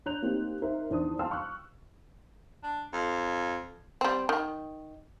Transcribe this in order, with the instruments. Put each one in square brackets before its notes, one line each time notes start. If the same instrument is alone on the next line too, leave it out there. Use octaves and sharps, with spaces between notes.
[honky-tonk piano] D4 C#5 A#5 F#6 G6 F7
A#3 C4 D#4 G4
D#4 A#4 C5 E5
E2 D#3 D4 C5 A5 D#6
F5 G5 A5 C6 E6 F6
C#6 F#6
[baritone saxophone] D4
F2
[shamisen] G3 C4
D#3